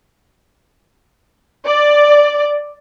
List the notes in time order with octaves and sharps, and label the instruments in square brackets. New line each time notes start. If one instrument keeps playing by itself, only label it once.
[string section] D5